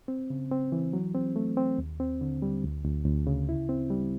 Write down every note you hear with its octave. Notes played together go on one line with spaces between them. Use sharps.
C4
C#3
C4
E3
F#3
C4
A3
C4
D#2
C4
D3
G3
D2
D2
D2
C#3
E4
C4
G3